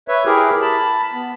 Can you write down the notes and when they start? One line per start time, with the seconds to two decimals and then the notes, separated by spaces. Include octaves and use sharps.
0.08 B4 C#5 E5
0.26 E4 G4 G#4 A#4
0.62 A5 B5
1.13 B3